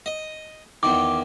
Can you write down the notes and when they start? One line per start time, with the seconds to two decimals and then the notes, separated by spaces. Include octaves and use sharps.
0.06 D#5
0.83 E2 D#3 D6